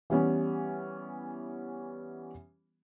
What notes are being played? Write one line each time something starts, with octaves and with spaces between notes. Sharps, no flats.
E3 G3 B3 C#4